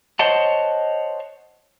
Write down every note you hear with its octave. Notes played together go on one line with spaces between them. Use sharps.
C5 C#5 D#5 F#5 A5